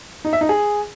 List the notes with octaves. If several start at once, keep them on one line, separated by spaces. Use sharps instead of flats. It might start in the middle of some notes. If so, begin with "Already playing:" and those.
D#4
E5
D#4
G#4